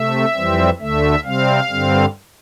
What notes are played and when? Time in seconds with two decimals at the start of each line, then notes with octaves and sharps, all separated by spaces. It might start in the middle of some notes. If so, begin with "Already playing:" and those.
Already playing: C3 A3 E5
0.34 F2 E3 G3 C4
0.79 D2 D3 A3 E5
1.24 C3 G3 C4 F5
1.69 G2 D3 G3 C4